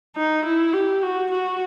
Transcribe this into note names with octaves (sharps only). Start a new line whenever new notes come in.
D#4
E4
G4
F#4
F#4